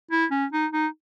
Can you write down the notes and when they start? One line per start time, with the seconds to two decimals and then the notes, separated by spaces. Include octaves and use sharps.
0.11 E4
0.31 C#4
0.52 D#4
0.73 D#4